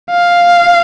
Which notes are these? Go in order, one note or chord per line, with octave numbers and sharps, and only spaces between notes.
F5